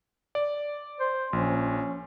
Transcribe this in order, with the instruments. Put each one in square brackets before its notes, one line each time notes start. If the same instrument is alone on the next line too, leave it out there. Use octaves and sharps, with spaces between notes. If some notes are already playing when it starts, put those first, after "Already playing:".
[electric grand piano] D5
[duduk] C5
[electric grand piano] A#1 [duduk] C#4